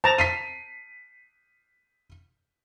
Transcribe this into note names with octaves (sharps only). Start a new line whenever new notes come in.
C5 A5 A#5
B6 C7 D#7